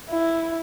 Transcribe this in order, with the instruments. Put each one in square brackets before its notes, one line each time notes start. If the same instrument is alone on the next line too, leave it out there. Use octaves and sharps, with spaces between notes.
[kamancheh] E4